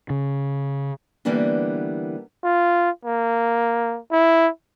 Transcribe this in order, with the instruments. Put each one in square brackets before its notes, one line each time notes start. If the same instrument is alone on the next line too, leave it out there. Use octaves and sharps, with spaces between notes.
[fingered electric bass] C#3
[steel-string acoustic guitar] D3 E3 G3 A#3 B3 D4
[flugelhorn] F4
A#3
E4